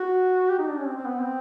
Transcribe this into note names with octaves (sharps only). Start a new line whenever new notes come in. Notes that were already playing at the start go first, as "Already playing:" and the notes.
Already playing: F#4
G4
D#4
D4
C#4
C4
C4
B3
C4